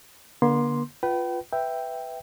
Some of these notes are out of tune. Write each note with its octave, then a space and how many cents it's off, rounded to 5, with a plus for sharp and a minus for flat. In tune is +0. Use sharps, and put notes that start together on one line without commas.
D3 -5 A#3 +45 C6 +0
F4 +0 B4 +0 G5 -35
B4 +5 E5 +0 G5 +0